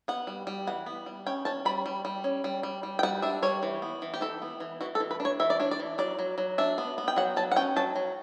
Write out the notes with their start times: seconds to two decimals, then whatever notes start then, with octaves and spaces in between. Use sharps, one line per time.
0.08 B3 F#5
0.27 G3
0.47 G3
0.67 E3 F#5
0.86 B3
1.06 G3
1.26 C#4 G5
1.45 C#4 A5
1.65 G3 B5
1.86 G3
2.05 G3
2.24 C#4
2.44 G3
2.63 G3
2.83 G3
2.99 G5
3.03 G3 F#5
3.22 D4 E5
3.43 G3 C#5
3.63 E3
3.82 B3
4.02 E3
4.14 G4
4.21 E3 A4
4.42 B3
4.60 E3
4.81 E3 F#4
4.95 A4
5.00 E3
5.11 B4
5.20 D4
5.25 C#5
5.40 E3 E5
5.50 D5
5.60 D4 C#5
5.71 D5
5.80 E3
5.98 F#3 D5
6.19 F#3
6.38 F#3
6.58 D4 E5
6.78 B3
6.98 B3
7.08 G5
7.16 F#3 F#5
7.36 F#3 A5
7.52 F#5
7.56 C#4 G5
7.76 F#3 A5
7.96 F#3